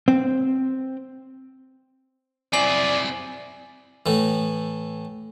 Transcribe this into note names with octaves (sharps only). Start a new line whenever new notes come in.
C4
F#2 C4 E4 G#4 D5 G#5 C7 F#7
A2 E3